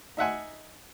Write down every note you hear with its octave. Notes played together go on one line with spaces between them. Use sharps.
D#4 E5 F#5 G#5